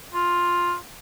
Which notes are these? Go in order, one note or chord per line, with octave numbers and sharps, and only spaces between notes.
F4